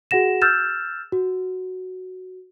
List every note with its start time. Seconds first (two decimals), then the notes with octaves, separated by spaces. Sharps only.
0.11 F#4 G#4 F#5 A#6 E7
0.42 E6 F6 G6 A6 E7
1.12 F#4